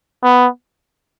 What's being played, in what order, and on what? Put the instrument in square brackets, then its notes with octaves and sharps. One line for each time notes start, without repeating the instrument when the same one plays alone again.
[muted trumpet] B3